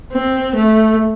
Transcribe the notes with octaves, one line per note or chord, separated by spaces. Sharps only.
C4
A3